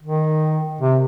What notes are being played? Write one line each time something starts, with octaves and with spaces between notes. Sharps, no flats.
D#3
C3